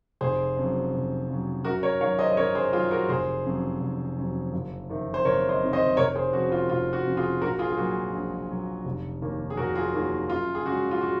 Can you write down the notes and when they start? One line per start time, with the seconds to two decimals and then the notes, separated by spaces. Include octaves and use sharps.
0.21 F1 G#4 C5
0.57 F2 C#3 F#3
0.93 F1
1.28 F2 C#3 F#3
1.65 F#2 F#4 A#4
1.83 A#4 C#5
2.01 D#3 F#3 C#5 F5
2.19 C5 D#5
2.31 D#5
2.37 F#2 A#4 C#5
2.55 G#4 C5
2.73 F#3 F4 G#4
2.77 D#3
2.91 F#4 A#4
3.08 F1 G#4 C5
3.45 F2 C#3 F#3
3.80 F1
4.17 F2 C#3 F#3
4.53 F#1
4.89 F2 C3 D#3
5.14 C5
5.25 F#1 A#4 C#5
5.49 C5 D#5
5.62 F2 C3 D#3
5.73 C5 D#5
5.97 F1 A#4 C#5
6.15 G#4 C5
6.33 F2 F#4
6.38 C#3
6.52 F4
6.69 F1 F4
6.93 F#4
7.05 F2 C#3
7.17 F4 G#4
7.41 A#1 F#4 A#4
7.59 F4 G#4
7.69 G#4
7.77 A#2 F#3 F#4
8.13 A#1
8.49 A#2 F#3
8.85 F1
9.22 D#2 D#3 A#3
9.50 G#4
9.57 F1 F#4 A#4
9.75 F4 G#4
9.94 D#2 D#3 A#3 F#4
10.29 F#2 F4
10.55 G#4
10.65 C#3 G#3 C#4 F#4
10.91 F4
11.01 F#4